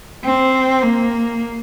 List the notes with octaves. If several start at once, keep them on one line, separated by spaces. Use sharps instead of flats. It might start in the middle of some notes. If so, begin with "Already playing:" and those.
C4
A#3